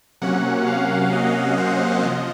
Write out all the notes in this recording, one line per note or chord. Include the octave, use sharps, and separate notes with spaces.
C3 F#3 A#3 C#4 F#5
F5
D#5
C5
F3 D#5